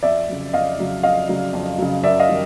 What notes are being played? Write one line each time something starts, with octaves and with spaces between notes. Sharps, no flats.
F2 D5 E5
C#3 F#3
F2 D#5 F5
C#3 F#3
F2 D#5 F5
C#3 F#3
F2
C#3 F#3
F#2 D5 E5
D#5 F5
D#3 G3